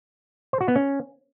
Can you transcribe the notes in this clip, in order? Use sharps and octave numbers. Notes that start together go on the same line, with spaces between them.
C5
F#4
B3
C#4